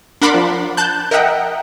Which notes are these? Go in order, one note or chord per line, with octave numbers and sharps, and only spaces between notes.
D4 A#4 F#5 B5 C6 D6
F3
A5 F#6 G6
A#4 D#5 E5 F#5 G5